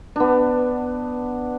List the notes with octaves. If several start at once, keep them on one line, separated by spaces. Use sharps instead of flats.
B3 D4